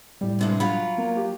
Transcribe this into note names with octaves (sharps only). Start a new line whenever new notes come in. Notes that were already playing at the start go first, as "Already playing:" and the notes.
A2 G3
G2 C3 G#3
F#3 F4 B5
A#3
G4